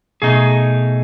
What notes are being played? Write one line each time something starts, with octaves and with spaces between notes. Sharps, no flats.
B2 A3 D#4 G#4